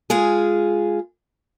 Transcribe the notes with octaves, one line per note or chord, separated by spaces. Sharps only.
G#3 F4 G#4